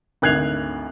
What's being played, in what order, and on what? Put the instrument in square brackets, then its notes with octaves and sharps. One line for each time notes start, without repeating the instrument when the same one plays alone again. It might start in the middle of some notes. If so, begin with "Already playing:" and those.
[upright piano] G#1 D2 F#6 G#6 C7 F7